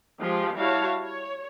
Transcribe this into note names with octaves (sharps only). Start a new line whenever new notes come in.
F3 G#3 G4 G#4
G3 E4 F#4 C#5 F5 A5
C#5